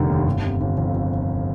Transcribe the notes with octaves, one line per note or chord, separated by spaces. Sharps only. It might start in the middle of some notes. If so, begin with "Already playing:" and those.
Already playing: F1 D3 D#3 G3
D#2
G1
C3
G1
F2